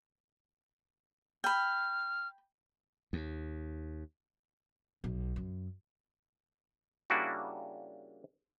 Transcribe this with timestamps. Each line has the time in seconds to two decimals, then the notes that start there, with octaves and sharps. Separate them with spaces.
1.44 G5 B5 F6
3.13 D#2
5.04 B1
5.36 F#2
7.10 C#3 G3 A#3 D4 E4 F#4